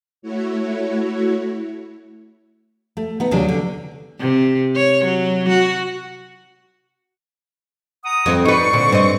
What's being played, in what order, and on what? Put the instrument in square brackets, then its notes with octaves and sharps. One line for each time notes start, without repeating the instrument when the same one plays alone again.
[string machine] A3 E4 F#4 C#5
[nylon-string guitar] A3
B3 D#4
D#2 C3 F#3 D4 G#4
D3
[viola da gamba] C3
C#5
F#3
F#4
[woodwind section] F#5 A#5 D#6
[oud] F2 C4
[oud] D#4 B4 [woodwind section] C5 D5 C#6
[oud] A#2 D3 C4
G2 C4 D#5